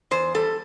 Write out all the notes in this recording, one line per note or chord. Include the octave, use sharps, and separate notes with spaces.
E2 C5
G3 A4